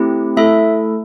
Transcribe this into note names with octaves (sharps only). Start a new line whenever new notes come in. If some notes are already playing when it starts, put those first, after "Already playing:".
Already playing: A3 C4 E4 G4
A3 E4 A4 E5